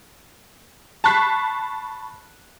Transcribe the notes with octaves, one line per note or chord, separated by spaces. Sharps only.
A5 B5 C#6 F#6 B6 C7